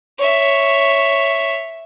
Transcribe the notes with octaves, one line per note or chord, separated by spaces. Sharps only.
C#5 E5